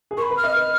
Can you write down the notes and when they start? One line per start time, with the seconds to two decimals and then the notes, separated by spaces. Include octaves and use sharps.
0.11 G#4
0.17 A#4 C#6
0.22 B5
0.30 B4
0.37 F6
0.44 D#5
0.56 B4